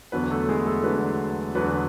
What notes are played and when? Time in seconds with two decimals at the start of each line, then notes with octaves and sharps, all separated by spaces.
0.12 E2 D3 F#3 B3 B4
0.30 A3 A4
0.49 G#3 G#4
0.66 A3 A4
0.84 E2 D3 F#3 B3 B4
1.55 E2 D3 F#3 B3 B4